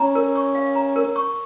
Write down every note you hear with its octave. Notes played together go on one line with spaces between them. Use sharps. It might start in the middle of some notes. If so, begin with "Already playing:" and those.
Already playing: C#4 A#5
A#4
C#6
F5
A#5
A#4
C#6